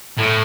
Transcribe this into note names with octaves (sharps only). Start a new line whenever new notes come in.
A2